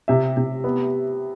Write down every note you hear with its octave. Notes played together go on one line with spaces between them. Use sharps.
C3 E5
C3
B3